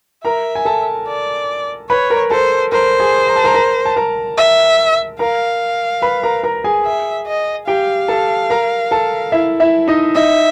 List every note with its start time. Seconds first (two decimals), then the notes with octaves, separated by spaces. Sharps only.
0.24 A#4 E5 A#5
0.55 G#5
0.65 A4 A5
1.08 D5
1.90 B4 C#5 B5
2.10 A#4 A#5
2.30 A4 C5 A5
2.72 A#4 C5 A#5
3.00 G#4 G#5
3.27 A#5
3.36 A5
3.44 A#4 A#5
3.54 A#4 A#5
3.85 A5
3.96 A#4 A#5
4.38 E5
5.19 A#4 F5 A#5
6.02 B4 B5
6.23 A#4 A#5
6.43 A#4 A#5
6.64 G#4 G#5
6.85 E5
7.27 D#5
7.67 G4 F5 G5
8.08 A4 A5
8.50 A#4 A#5
8.91 A4 A5
9.32 E4 E5
9.60 E4 E5
9.88 D#4 D#5
10.15 D#4 D#5 E5